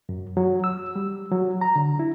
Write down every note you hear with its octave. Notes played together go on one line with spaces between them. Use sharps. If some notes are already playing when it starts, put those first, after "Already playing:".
F#2
F#3
E6
G3
F#3
A#5
D3
E4